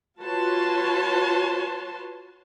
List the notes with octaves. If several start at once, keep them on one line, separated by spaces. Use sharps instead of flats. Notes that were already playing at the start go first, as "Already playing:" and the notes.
F4 F#4 B4 C#5 A5 C6